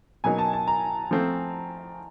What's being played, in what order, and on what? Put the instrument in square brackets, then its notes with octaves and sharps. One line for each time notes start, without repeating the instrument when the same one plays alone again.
[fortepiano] B2 F#3 A#3 D#4 [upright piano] G#5
[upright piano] A5
A5
A#5
[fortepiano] F3 A3 C4